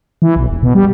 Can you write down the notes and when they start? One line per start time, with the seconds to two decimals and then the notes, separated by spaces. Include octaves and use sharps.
0.22 E3
0.36 B1
0.49 E1
0.63 B2
0.75 G3